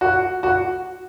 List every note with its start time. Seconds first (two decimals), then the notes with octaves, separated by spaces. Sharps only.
0.01 F#4
0.43 F#4